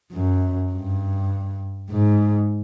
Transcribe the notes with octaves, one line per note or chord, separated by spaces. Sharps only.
F#2
G2
G#2